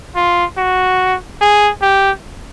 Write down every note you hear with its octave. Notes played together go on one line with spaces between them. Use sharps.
F4
F#4
G#4
G4